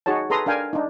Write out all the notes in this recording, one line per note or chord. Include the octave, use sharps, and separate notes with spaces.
D#4 F#4 G#4 C#5 A5
G#4 A4 B4 A#5 C6 D#6
D4 A#4 F5 G5 G#5
D4 D#4